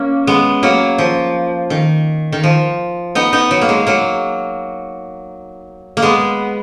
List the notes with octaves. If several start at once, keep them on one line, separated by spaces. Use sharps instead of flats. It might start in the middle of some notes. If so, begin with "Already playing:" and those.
Already playing: A#3 C#4
G#3 B3
F#3 A#3
F3
D#3
D#3
F3
B3 D#4
B3 D#4
F#3
A#3
G#3
F#3 A#3
A#3
G#3 B3